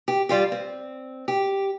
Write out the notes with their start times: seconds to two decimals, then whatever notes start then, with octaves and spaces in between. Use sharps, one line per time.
0.08 G4
0.29 G3 F4 G4
0.52 C4
1.28 G4